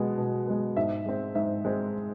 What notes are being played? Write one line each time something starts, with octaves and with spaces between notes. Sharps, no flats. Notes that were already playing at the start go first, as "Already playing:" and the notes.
Already playing: B2 G#3 B3
B2
G#3 B3
G#2 E5
G#3 C4
G#2 E5
G#3 C4